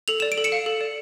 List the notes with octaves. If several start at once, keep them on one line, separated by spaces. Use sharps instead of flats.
A4 F7
D5 E7
D7
A4
C#7 E7
F5
A4
D5